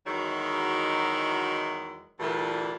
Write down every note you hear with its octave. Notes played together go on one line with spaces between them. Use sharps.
E2 D#3 F#3 G#3 E4 F#4
D2 G2 A#2 E3